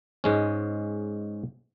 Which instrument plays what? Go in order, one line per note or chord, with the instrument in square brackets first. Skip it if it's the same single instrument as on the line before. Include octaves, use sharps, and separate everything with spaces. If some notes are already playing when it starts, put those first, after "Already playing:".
[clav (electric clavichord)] G#2 G#3 C#4